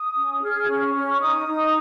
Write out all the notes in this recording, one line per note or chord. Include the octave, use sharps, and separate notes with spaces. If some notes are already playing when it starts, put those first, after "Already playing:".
Already playing: D#6
C#4
G#4 F6
C#4
C#4
C#6
D#4 D#6
D#4